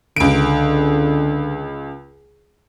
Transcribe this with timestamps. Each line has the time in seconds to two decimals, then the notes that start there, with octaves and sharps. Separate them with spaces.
0.16 C#2 D3 D7